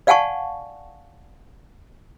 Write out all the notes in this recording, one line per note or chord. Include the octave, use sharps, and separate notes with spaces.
D5 F5 F#5 G#5 A5 C#6